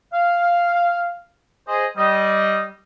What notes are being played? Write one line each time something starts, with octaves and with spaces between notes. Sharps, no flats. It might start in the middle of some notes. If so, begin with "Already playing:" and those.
F5
G#4 C5 D#5
G3 D#5